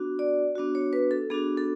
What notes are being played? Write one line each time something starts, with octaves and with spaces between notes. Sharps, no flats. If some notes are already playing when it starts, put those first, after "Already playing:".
Already playing: B3 D4 F#4
D5
B3 D4 F#4
C#5
B4
A4
B3 D4 F#4 G#4
A4